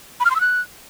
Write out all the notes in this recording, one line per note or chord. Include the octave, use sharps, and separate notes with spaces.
B5
F6
C6
E6
F#6